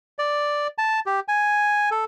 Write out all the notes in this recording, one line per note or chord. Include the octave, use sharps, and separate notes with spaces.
D5
A5
G4
G#5
A4